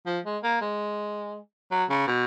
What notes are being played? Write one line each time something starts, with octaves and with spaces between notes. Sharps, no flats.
F3
G#3
A#3
G#3
F#3
C#3
B2